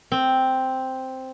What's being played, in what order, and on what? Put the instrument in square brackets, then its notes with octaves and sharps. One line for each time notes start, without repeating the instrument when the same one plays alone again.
[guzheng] C4